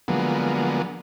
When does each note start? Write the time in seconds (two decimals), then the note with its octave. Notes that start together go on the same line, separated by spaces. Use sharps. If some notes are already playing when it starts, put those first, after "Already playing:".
0.08 D3 F3 F#3 G#3 A#3 B3